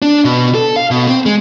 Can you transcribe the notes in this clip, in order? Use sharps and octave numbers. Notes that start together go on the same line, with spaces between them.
D4
B2
A4
F5
B2
C4
G#3